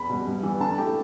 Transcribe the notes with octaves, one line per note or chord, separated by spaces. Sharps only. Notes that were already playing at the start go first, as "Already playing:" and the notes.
Already playing: E2 B5
B2 G3
G2
E3 G3 B3
D3 A5
A3 E4 G4